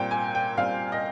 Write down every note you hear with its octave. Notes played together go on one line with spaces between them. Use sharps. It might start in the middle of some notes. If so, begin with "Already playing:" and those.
Already playing: A#2 G3 C4 G5
G#5
G5
A#2 G3 C4 F5
D#5